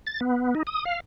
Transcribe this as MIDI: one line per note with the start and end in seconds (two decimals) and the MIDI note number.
0.07 0.20 93
0.21 0.54 59
0.55 0.63 63
0.67 0.85 87
0.85 1.00 77